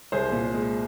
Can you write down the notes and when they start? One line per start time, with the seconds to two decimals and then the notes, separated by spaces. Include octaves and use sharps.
0.12 C2 G#4 C5
0.32 A#2
0.54 G#3